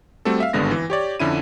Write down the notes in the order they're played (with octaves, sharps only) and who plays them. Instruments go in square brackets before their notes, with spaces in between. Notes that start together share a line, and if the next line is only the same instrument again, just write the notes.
[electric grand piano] G3 A3 C4 F#4 A4
E5 F5
G#1 G2 D3 G#3 B3 A#6
E3
G4 C#5 D5
F2 D3 C#4 E4 D#7